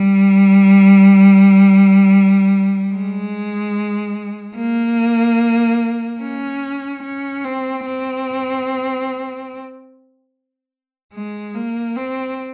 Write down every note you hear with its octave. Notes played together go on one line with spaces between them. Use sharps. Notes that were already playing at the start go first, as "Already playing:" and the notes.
Already playing: G3
G#3
A#3
C#4
C#4
C4
C4
G#3
A#3
C4